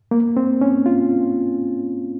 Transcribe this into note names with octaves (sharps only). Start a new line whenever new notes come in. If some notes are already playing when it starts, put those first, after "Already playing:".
A#3
C4
C#4
F4